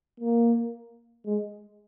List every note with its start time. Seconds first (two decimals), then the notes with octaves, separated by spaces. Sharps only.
0.20 A#3
1.26 G#3